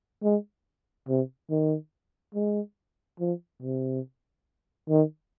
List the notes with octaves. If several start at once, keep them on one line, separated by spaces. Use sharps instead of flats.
G#3
C3
D#3
G#3
F3
C3
D#3